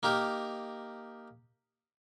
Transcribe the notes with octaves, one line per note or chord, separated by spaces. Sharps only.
A#3 D#4 G4 A#4